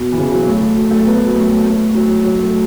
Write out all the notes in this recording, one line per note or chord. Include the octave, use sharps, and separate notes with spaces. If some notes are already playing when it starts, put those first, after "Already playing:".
Already playing: B2
E3
C#3
F#3
A3
F#3
A3
B3
F#3
A3
A3
F#3
F#3
A3